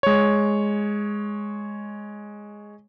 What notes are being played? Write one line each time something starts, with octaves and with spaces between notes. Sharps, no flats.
G#3 C#5